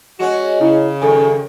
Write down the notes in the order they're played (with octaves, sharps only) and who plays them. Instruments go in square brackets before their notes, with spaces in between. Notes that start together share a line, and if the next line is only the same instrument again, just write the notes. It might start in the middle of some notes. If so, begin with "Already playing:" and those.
[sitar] G#3 C#4 [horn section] F#4
[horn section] C#3 [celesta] E4
[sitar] F#2 D#3 [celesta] A4 G#5